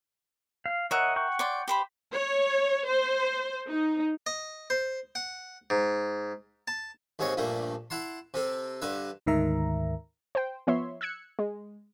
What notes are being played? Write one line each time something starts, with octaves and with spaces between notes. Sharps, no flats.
F5
A#4 C#5 D#5 E5 F#5
F#5 G5 C#6
C#5 D5 C6
G4 C5 B5
C#5
C5
D#4
D#5
C5
F#5
G#2
A5
D#2 G#2 G#3 C4 C#5 C#6
A#1 G2 A3 A#3
E4 F#5 A5 C6
C3 C4 A4
G2 D3 B4 E5
D2 G#2 D#3 A#4 E5 A#5
C5 G5
F3 B3 C#5 E5 C6
E6 F#6 G#6 C#7
G#3